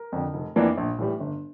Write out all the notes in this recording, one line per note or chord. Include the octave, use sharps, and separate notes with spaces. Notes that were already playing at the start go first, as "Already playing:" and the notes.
Already playing: A#4
F2 D3
F1
F2 E3 A#3 D4
A#1
A2 E3 G3
G1